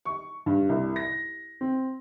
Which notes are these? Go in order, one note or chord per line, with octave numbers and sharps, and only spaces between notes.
C#6
G2
C2
A#6
C4